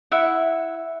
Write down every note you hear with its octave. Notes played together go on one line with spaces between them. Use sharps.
E4 E5 F#5